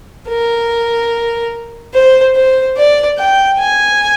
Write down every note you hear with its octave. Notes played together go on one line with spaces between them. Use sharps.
A#4
C5
C5
D5
G5
G#5